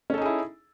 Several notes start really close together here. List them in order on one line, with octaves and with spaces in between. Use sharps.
C#4 A4 D#4 G#4 E4